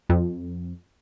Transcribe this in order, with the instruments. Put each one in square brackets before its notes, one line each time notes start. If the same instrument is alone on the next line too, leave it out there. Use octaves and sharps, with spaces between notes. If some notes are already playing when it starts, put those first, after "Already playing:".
[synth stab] F2